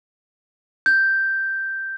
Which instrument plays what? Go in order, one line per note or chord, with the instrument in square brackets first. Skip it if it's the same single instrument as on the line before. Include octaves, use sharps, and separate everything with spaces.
[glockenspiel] G6